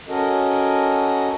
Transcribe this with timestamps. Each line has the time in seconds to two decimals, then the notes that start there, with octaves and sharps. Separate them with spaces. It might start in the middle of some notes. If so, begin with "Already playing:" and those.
0.08 C#4 F#4 A4 A#4 D#5